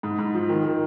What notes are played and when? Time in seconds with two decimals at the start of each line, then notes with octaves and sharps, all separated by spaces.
0.03 G#2
0.19 G#2
0.34 F3
0.49 D#3
0.64 D#3